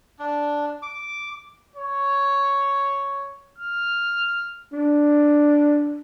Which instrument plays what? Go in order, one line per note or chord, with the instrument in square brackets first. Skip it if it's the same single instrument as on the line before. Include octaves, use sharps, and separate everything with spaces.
[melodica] D4
D6
[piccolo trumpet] C#5
F6
[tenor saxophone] D4